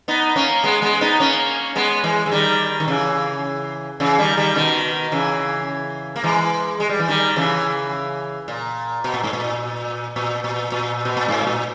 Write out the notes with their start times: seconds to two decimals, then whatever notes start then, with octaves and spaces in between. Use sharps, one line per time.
0.08 B3 D#4
0.36 A#3 C#4
0.64 G#3 B3
0.82 G#3 B3
1.01 B3 D#4
1.20 A#3 C#4
1.75 G#3 B3
2.04 E3 G#3
2.26 E3
2.32 D#3 G3
2.80 D#3
2.88 C#3 E3
4.00 C#3 E3
4.19 D#3 G3
4.37 D#3 G3
4.56 B2 D#3
5.12 C#3 E3
6.16 A#3
6.24 E3 G#3
6.80 G#3
6.89 G3
6.99 E3
7.08 D#3 G3
7.36 C#3 E3
8.48 A#2
9.04 B2
9.14 A#2
9.23 G#2
9.33 A#2
10.16 A#2
10.44 A#2
10.72 A#2
11.05 B2
11.17 A#2
11.28 G#2
11.41 B2
11.47 A#2